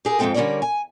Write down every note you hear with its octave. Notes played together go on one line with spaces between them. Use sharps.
G4 G#4 A#4
F2 G#2 G#3 C4 A4 G5
D3 G3 C#4 A#4 C#5 D5
G#5